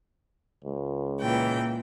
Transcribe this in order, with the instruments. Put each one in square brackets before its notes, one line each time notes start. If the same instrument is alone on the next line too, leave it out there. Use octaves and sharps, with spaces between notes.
[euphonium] C#2
[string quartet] A#2 E3 G5